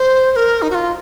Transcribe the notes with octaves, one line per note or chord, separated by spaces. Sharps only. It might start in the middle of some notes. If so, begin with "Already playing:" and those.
Already playing: C5
C5
A#4
D#4
F#4
F4